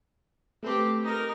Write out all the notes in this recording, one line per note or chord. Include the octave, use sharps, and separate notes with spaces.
A3 C4 G4 A4 B4
D#4 A#4